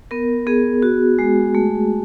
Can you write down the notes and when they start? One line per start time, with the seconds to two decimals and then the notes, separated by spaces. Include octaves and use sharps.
0.11 B3 A#4
0.47 B3 G#4
0.82 F#4
1.19 G#3
1.55 A3